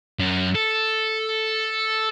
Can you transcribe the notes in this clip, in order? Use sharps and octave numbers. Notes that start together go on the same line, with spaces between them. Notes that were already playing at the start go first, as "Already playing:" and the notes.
F#2
A4